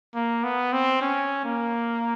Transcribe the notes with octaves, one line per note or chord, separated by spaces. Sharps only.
A#3
B3
C4
C#4
A#3